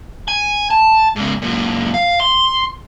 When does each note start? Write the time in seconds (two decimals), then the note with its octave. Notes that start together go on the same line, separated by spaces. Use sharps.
0.28 G#5
0.70 A5
1.16 G#2 C#3
1.42 F#2 A#2
1.94 F5
2.20 C6